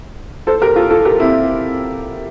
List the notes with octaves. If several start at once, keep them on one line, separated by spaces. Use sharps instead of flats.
A4 C5
G4 A#4
F4 A4
F4 A4
G4 A#4
C4 E4